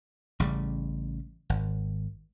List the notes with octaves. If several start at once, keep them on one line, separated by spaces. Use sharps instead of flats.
A1 C#3 G3
G#1